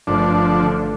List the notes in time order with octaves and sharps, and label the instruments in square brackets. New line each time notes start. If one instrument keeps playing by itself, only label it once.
[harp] G1 A3 [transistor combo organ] D3 F3 D4